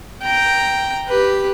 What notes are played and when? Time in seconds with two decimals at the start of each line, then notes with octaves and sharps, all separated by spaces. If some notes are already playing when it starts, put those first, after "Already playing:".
0.23 G5 A#5
1.08 G4 B4